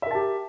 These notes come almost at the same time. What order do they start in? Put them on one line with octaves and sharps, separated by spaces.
E5 A#4 A5 G4